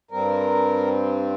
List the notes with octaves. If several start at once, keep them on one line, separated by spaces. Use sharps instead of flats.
G2 G3 C4 A#4